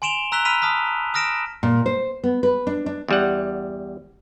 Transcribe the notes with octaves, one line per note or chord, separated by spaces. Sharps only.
G#5 C6 D7 E7 F7 G7
A#5 E6 F#6 B6 F7 G7
B5 E6 F6 B6 D#7 F7
A5 D#6 F6 B6
D#6 F6 A#6 D7 E7
A#2
C5
B3
B4
D4
D4
E2 G3 F#5